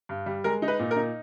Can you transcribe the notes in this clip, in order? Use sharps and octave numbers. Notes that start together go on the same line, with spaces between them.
G2
G3
G#3 A#4
D#4
B4
A#2
A#4
D#4